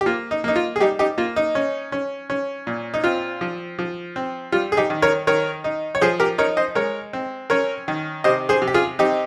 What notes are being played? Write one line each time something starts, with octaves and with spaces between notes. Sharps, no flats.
G4
A#3 F4
D#4
A#3 D#4
F4
G#4
G3 D#4 G4
D#4 G4
A#3 F4
D#4
C#4
C#4
C#4
A#2
D#4
C4 F4
F3
F3
C4
G3 F4
G#4
D#4 G4
D#3
A#4 C#5
D#3 A#4 C#5
D#4
C#5
F3 G#4 C5
G4 A#4
D#4 A#4 C#5
C5 D#5
G#3 A#4 C#5
C4
C#4 A#4 C#5
D#3
C3 C5 D#5
G#4 C5
C3
G4
F4 G#4
C4 D#4 G4